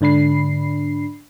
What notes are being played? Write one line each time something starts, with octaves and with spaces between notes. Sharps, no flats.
G#2 D3 D4 B5 C7